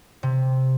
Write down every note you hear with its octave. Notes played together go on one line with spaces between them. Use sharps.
C3